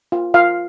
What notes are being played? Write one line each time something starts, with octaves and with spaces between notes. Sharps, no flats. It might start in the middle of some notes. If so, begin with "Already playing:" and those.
F4
F4 F5